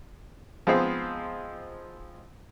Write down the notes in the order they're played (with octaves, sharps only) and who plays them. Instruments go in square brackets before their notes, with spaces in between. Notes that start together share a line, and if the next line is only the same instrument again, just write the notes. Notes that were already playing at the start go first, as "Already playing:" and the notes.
[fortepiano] F3 G#3 B3 C4 D#4 G#4